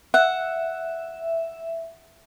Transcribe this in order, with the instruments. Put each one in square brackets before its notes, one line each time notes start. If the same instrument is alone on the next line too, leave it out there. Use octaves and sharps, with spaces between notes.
[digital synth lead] E5 [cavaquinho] F#5